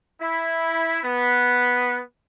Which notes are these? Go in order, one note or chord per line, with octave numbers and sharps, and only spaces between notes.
E4
B3